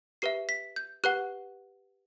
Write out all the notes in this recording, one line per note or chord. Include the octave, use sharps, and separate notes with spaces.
G4 B4 E5 C7
B6
G6
G4 B4 F#5 F#6